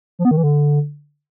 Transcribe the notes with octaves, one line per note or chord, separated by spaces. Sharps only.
F3
B3
D#3
E3
D3